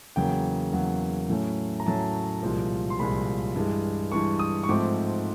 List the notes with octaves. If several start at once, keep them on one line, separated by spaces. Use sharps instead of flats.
E2 C#3 F#3 A#3 G5
E2 C#3 F#3 A#3
A2 F#3 A3 C#4
A#5
A2 F#3 A3 C#4 A5
C2 A#2 F3 G#3
C6
C2 A#2 F3 G#3 B5
G2 E3 G#3
G2 E3 G#3 C#6
D#6
C#6
G#2 F3 A3 C4 D6